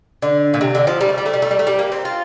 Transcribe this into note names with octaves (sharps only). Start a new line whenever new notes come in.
D3
A#2
C3
D3
F3
G3
A3
G3
A3
G3
A3
G3
A3
G3
A#3
C4
F4